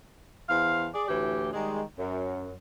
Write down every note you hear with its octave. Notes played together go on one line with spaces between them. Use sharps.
E2 C5 F5
G#4 D5
D2 A2 E3 G4
D#3 G3 G#3
F#2